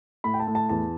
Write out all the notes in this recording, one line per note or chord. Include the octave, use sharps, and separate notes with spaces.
A2 B5
G5
A5
A2
A5
E2 A5